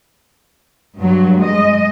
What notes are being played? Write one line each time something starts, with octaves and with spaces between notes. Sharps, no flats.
G2 F#3
G#3 D#5